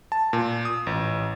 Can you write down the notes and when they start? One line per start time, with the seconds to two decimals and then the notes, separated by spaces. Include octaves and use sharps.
0.12 A5
0.33 A#2
0.65 D#6
0.87 A1